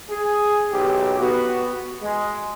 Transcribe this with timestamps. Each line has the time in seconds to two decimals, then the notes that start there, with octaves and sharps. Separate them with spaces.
0.11 G#4
0.73 B1 G4
1.20 B3 F#4
2.03 G#3